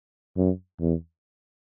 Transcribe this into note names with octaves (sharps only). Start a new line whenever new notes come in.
F#2
E2